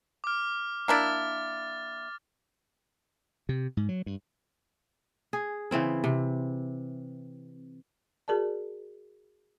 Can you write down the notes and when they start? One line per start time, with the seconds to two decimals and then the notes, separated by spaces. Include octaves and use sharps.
0.24 D6 F6
0.88 A#3 D4 E4 F6 A6
3.49 C3
3.77 G#2
3.89 F#3
4.06 G2
5.33 G#4
5.71 C#3 E3 C4 E4
6.04 C3
8.28 F#4 G#4 A#4 D5 A5